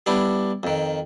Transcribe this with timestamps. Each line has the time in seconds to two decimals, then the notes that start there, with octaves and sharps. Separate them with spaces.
0.06 G3 B3 D4 E4
0.63 F2 D#3